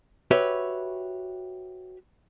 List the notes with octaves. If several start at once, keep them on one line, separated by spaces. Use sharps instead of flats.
F#4 G4 B4 C#5 E5